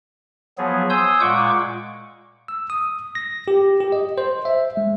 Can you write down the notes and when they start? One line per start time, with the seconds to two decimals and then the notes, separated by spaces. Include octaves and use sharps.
0.58 F3 F#3 B3 G#4
0.90 G#5 C6 D#6 E6 G6
1.21 A#2 G#3 F#5 C#6 D6
2.48 E6
2.70 D#6
3.15 A#6
3.48 G4
3.80 G4
3.92 D#5
4.18 C5
4.45 E5
4.77 G#3